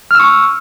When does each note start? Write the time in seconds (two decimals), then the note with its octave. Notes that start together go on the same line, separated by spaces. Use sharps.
0.11 F6
0.15 E6
0.20 C#6